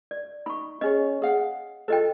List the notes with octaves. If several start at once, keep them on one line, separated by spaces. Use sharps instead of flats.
D5
D#4 B5 C#6
C#4 G#4 C#5 D#5
G#4 F5 F#5
F4 A4 C5 D#5 G5